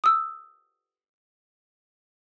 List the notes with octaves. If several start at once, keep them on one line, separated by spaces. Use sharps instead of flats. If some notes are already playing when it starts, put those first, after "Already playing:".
D#6 E6